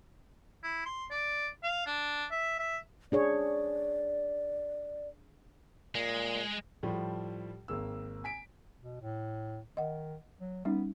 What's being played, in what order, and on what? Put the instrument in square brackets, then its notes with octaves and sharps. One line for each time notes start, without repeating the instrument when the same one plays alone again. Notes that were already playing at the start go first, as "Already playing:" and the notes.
[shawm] E4
C6
D5
F5
D4
E5
E5
[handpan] D4 G#4 C#5 [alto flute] D5
[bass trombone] A#2 [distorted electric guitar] G#3
[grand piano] A2 F3 G3
G#1 A#3 E6
G#5 B6 D7
[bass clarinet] B2
A2
[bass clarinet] D#3 [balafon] D#5 F#5
[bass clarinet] F#3
[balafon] G3 C#4 D#4 [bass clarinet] B3